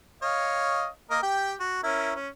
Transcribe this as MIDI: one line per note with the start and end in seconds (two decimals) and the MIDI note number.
0.22 0.87 73
0.22 0.87 75
0.22 0.87 77
1.10 1.19 58
1.10 1.19 70
1.10 1.19 75
1.22 1.55 67
1.22 1.55 79
1.60 1.82 66
1.83 2.13 61
1.83 2.13 64
1.83 2.13 70
2.15 2.28 61